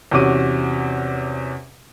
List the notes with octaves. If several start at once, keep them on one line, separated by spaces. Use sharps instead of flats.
E2 C3 C#4 F#4 D6 D#7